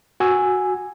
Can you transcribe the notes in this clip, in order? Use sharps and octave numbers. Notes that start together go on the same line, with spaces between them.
F#4 G#5 E6